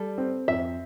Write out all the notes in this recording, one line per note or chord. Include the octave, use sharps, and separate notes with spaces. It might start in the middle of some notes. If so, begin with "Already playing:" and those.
Already playing: G3 A4
C4
F2 E5